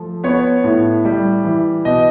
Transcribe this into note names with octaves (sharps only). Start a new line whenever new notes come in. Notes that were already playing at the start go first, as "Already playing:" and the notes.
Already playing: F3 A3
B3 C#5
A2
G3
E3
B2 D#5